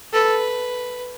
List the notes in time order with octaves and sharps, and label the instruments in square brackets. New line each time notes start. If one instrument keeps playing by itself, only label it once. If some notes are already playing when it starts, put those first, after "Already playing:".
[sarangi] A4 [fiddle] B4